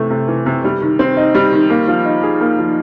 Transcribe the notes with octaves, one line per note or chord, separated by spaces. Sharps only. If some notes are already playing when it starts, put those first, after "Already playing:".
Already playing: C3 E3 A3
C3
E3
C3
G3
D#3
C4
D#4
G3
D#3
A#3
F3
D#4
G#4
A#3
F3